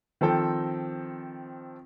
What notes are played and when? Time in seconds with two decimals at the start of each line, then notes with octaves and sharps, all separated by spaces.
0.21 D#3 F3 C4 A4 G5